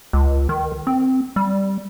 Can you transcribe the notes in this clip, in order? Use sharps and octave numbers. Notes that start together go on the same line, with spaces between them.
C#2
D#3
C4
G3